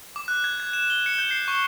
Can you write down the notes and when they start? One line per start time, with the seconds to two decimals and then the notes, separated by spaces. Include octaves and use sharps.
0.16 D6
0.28 F#6
0.44 G#6
0.60 G#6
0.73 E7
0.90 G7
1.06 C#7
1.18 G6
1.31 C7
1.48 C#6